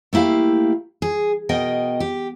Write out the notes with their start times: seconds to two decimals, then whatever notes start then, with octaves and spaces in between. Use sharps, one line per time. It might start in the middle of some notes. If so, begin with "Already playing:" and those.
0.13 A3 A#3 E4 G4 F5
1.02 G#4
1.49 B2 A#4 D#5 G5
2.00 G4